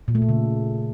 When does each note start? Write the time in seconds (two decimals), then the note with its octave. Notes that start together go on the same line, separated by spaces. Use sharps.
0.08 A#2
0.15 A3
0.22 A#2
0.29 C#3